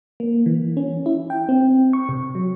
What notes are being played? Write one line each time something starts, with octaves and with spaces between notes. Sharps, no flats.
A#3
E3
C#4
E4
G5
C4
C#6
C3
F#3